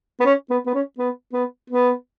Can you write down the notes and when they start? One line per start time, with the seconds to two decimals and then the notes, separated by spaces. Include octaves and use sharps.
0.20 B3
0.25 C#4
0.50 B3
0.66 B3
0.74 C#4
0.98 B3
1.33 B3
1.70 B3